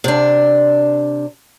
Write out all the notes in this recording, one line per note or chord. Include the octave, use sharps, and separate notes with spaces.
C3 D4